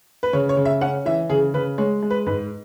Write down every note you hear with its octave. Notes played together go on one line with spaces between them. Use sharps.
B4
C#3 C#5
C#5
C#3
E5
C#4 F#5
E3 E5
C#3 G#4
C#3 B4
G#3 C#5
G#3
B4
G#2 B4